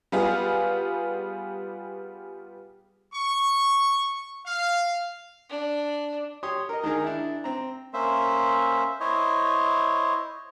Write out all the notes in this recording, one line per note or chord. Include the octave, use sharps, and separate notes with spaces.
G3 B3 F4 G#4
C#6
F5
D4
G4 C#5 C6 D#6
A#4 D#5
D#3 D#4 G#4 A#4
D4 E4
C4 A#5
A#3 C#4 C5 E5
E4 C5 C#5 D#5